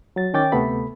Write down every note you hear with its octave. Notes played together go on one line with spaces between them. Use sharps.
F#3 A6
D#3 C#4 G5 D6 A6
D2 C3 A3 B3 A4 B5